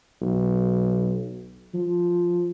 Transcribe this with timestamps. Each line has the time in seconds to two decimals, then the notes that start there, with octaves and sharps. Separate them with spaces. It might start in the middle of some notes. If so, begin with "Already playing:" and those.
0.22 B1
1.74 F3